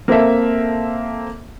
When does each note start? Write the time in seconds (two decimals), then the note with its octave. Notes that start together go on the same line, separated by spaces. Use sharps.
0.08 A#3 C4 A4 E5